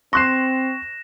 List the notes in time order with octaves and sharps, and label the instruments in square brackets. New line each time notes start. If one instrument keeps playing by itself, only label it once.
[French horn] C4 [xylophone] C6 [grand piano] C#6 F#6 C7 [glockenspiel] A#6 E7